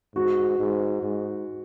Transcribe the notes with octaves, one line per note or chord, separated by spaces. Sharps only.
G#2 F#4
G#2
G#2